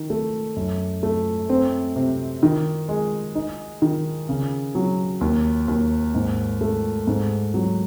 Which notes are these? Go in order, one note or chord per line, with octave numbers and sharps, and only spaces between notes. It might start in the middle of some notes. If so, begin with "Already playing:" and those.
Already playing: D#3
A3
F#2
A3
C4
C3
D#3
G#3
D#4
D#3
C#3
F#3
D#2
D#2
G#2
A3
G#2
F#3